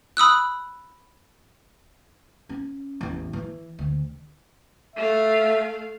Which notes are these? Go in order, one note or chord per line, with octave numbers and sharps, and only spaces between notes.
B5 D#6 E6 F#6
C#4
A1 E2
E3
D2
A3 E5 F5